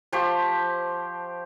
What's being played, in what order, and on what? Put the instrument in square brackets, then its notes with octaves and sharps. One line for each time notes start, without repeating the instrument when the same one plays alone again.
[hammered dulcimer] F3 G4 C5 C#6